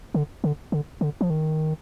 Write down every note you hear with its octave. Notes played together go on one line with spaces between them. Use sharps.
D3
D3
D3
D3
F3
D#3